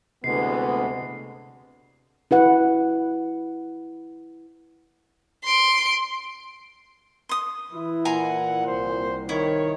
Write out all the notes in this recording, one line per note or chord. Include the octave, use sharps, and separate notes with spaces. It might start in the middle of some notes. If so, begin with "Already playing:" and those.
D2 C3 E3 G#3 B3 C7
E4 B4 F#5
C6 D7
C6 D#6
E3 E4
A#2 F#5 G#5 A#5 C6
C2 C5
D#3 E4 C#5